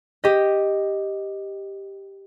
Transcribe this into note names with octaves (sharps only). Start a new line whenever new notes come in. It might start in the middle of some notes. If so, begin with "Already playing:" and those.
G4 D#5